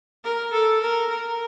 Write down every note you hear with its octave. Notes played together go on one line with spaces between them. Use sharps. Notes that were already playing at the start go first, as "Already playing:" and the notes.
A#4
A4
A#4
A#4